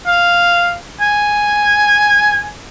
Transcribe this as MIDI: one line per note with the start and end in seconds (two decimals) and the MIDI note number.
0.06 0.74 77
1.01 2.47 80